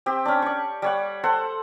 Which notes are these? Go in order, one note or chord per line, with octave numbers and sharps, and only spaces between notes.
C4 G4
C#4 D4
D5 C#6
G3 C#5 F#5
A4 C5 F#5